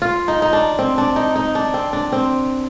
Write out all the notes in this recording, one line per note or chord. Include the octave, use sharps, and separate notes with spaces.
F4
D#4
D#4
D4
C4
D4
D#4
D#4
D4
C4
D4
C4